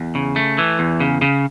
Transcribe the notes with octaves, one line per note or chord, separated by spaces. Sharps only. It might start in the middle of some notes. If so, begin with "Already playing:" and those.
Already playing: E2
C#3
A3
E3
E2
C#3
C#3